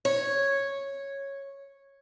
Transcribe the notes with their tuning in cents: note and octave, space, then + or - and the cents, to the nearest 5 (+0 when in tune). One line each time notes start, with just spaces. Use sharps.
C#5 -5